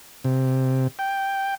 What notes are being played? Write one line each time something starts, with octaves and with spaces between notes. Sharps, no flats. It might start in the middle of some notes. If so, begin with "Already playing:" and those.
C3
G5